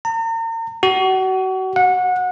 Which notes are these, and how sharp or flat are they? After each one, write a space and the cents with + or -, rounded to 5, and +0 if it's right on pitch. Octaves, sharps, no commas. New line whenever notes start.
A#5 -40
F#4 +30
F#5 -25